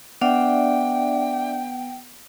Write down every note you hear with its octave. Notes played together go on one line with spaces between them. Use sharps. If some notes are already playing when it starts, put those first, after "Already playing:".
B3 D4 D5 E5 F#5 G5